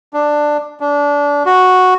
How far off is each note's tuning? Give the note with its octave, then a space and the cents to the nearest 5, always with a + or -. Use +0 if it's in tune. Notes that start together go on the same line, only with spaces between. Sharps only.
D4 +10
D4 -25
F#4 -5